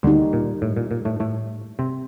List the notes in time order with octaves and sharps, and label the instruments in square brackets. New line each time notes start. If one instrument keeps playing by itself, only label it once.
[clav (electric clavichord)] D2 D3 [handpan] G3 A#3 D#4 G4
[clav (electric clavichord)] A#2
A2
A#2
A#2
A2 A3
A2 A3
C3 C4